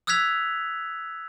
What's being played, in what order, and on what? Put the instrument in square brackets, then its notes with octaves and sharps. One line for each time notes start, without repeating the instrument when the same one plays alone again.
[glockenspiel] D#6 E6 F#6 G#6 B6 F7